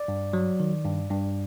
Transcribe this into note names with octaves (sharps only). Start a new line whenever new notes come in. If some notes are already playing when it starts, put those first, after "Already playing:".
Already playing: D5
G2
F#3
D#3
G2
G2